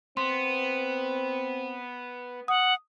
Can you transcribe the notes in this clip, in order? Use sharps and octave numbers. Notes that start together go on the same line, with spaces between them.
B3 C4 C6
F#5 D#6